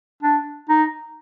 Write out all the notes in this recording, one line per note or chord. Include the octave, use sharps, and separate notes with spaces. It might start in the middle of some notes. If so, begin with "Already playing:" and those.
D4
D#4